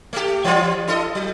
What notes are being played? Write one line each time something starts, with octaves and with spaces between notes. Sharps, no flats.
A3 G4
E3 G3 F4
E4 A4 D#5
F#3